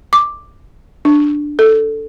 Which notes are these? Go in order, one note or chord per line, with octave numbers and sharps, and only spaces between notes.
D6
D4
A4